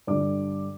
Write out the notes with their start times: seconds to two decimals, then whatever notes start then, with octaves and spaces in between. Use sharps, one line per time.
0.07 G2 D3 G3 D5 D6